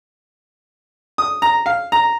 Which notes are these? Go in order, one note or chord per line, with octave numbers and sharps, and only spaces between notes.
D#6
A#5
F5
A#5